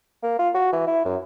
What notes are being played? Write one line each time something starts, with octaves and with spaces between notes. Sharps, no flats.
A#3
F4
F#4
E3
E4
F#2